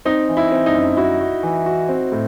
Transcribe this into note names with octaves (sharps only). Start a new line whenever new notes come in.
C4 D#4
E3
E4
C4
D#4
F#2
E4 F#4
F#4
E3
F#4
C4
A2